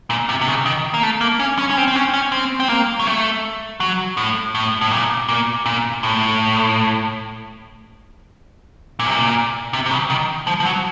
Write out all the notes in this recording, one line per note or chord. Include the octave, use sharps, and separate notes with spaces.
A#2
C3
C3
C#3
D#3
A#3
A3
A#3
C#4
C#4
C#4
C4
C4
C#4
C#4
C4
C4
A#3
F#3
A3
F#3
A2
A2
A2
A#2
A#2
A#2
A2
A#2
C3
A#2
C3
C3
C#3
D#3
F3
F3
F#3